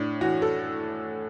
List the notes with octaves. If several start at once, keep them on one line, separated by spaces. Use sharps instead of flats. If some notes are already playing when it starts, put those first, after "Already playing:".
Already playing: A2 D4
E3 F#4
A4